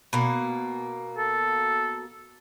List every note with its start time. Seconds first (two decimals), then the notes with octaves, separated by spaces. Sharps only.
0.13 B2 A#3
1.18 A4